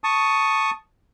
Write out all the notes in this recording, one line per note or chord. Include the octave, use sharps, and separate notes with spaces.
A5 C#6 D#6